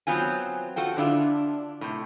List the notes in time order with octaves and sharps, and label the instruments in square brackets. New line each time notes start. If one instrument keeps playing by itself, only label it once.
[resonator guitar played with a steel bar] F#3 B3 C4 F4 G#5
F4 F#4 A4 G5
D3 D4 E4 F4
A2 C3